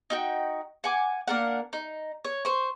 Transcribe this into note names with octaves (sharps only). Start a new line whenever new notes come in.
D#4 F#4 G5
F#5 G#5 D6
A#3 D4 A#4 F#5
D#4
C#5
C5 C#6